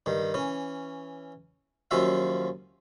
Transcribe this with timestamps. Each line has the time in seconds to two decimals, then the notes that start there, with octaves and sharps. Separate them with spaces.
0.06 G2 D#3
0.34 E3 C#4
1.91 D#2 F3 F#3 C#4 E5 F5